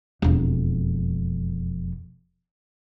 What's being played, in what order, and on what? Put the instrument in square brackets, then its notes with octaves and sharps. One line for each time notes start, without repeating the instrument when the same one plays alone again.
[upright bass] E1 F2